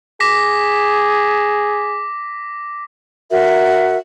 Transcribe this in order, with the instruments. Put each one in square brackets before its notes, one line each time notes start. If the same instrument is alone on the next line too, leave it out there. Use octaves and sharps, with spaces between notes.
[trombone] G#4 [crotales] D6 A#6 B6
[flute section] F#4 A#4 E5